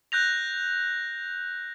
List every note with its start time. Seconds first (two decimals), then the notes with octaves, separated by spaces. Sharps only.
0.12 F#6 G6 A#6 F7